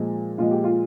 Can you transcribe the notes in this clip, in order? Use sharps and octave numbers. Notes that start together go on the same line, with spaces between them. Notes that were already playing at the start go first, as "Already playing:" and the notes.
Already playing: A#2 F3 G#3
A#2 F3 G#3 F4
G4
F4